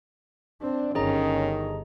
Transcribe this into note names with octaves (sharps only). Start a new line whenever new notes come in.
C4 D4
G1 D#3 C#4 G#4 D#5 A#5